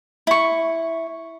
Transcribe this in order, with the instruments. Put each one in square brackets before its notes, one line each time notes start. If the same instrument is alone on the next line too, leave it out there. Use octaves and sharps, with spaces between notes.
[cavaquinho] E4 C#6